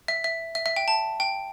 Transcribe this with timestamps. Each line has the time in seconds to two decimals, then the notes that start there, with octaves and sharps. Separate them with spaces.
0.08 E5
0.24 E5
0.55 E5
0.66 E5
0.76 G5
0.88 A5
1.20 G5